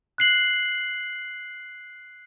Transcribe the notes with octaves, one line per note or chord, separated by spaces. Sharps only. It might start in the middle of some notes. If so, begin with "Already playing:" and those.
F#6 C7 F#7